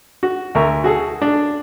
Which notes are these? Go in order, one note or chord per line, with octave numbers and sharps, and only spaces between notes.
F#4
D2 A#4 E5 C#6
F#4 G#4 A4
D4